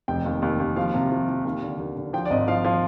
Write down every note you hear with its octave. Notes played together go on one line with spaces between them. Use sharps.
F1 G5
D#2
D#2
D#2
F3 F5
C3
F3
F3
D#2 F5
D3
D#2
D3
F3 G5
D5
G#1 D#5
F3 F5
F3